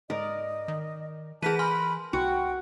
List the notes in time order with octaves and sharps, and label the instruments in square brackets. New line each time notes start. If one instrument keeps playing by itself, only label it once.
[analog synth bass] G#2 [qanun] A#4 D5 [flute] D#5
[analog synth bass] D#3
[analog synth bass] E3 [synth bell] G#4 B6 D#7 [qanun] A#4 B4 [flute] A5
[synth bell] G#5 C6 F6 [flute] B5
[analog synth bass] C2 [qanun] F#4 [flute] G5